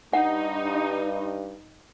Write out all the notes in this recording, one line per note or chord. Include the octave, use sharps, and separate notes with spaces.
G2 D#4 F#5